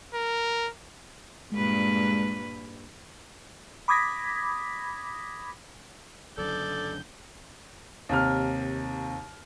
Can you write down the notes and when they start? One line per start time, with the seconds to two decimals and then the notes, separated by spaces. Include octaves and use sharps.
0.14 A#4
1.52 G2 A#2 G#3 B4
3.88 B5 D6 D#6 G#6 A#6 B6
6.38 F#1 F#2 D3 A4 D5 G6
8.09 D#2 C3 F6